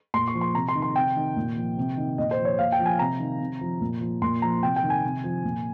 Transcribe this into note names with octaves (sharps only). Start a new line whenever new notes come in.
A#2 C6
C#6
F3
C6
C3 A#5
C6
D#3
C6
C3 G5
D#3
A#2
F3
C3
D#3
A#2 D#5
C5
F3
C#5
A#2 F5
G5
F3
G#5
C3 A#5
D#3
C3
F3
A#2
F3
A#2 C6
F3 A#5
C3 G5
G5
D#3
G#5
C3
F3
A#2